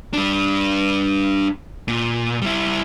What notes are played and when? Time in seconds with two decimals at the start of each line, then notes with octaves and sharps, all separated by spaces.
0.13 G3 D4
1.88 A#2
2.42 G3 E4